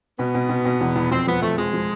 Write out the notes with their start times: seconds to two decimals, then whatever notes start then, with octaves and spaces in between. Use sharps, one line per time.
0.19 B2 B3
0.34 B2
0.49 B2
0.65 B2
0.81 E2
0.96 E2
1.11 F2 C4
1.27 F3 B3
1.42 F2 A3
1.58 F3 G#3
1.73 F3